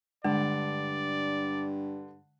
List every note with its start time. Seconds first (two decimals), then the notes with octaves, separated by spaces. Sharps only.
0.24 G2 D3 G#3 D5